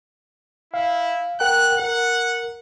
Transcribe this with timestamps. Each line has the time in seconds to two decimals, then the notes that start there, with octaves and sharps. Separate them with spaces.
0.74 E4 F5
1.40 A#4 F#5 G5 F#6
1.79 A#4 F#5